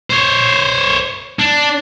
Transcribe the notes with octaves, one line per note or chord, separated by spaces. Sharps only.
C5 C#5
D4